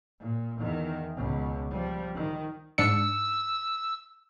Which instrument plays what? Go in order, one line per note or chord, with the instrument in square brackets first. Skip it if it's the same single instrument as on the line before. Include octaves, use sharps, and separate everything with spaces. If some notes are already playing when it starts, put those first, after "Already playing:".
[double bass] A#2
E2 D#3
C#2 B2
F3 G3
D#3
[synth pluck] G#2 D4 C#7 [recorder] E6